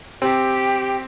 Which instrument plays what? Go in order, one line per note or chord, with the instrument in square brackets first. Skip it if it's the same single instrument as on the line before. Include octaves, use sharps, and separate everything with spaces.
[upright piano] C4 [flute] G4